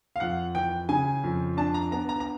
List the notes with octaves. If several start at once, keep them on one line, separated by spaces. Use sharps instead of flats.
F5
F2 F#5
E3 G5
C#3 G#5
F2
D4 A5
A#5
B3 A#5
A#5
A#5